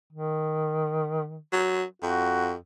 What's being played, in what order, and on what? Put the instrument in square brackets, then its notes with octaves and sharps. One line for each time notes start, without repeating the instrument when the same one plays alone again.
[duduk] D#3
[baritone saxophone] F#3
[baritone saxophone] F2 [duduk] F#4